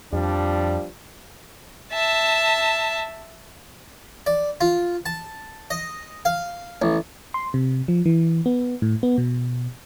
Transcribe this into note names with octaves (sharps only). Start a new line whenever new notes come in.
F2 F3 G3 D4
E5 A5
D5
F4
A5
D#5
F5
A1
C6
C3
F3
E3
B3
A2
B3
B2